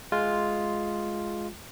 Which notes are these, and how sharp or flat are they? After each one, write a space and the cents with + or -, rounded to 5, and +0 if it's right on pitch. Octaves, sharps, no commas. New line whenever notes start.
G#3 +10 F4 +0